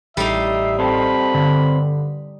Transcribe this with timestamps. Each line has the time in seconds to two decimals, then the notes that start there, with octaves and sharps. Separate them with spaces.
0.17 A1 A2 G3 D#4 E5 C7
0.79 C4 A4 B5
1.34 G2 D3